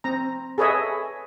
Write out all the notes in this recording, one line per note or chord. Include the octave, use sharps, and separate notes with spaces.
C4 A#5
G#4 A4 B4 C#5 D#5 E5